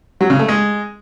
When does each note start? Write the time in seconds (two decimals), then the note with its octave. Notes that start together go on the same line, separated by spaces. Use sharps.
0.21 F#3
0.30 C#3
0.39 A3
0.48 G#3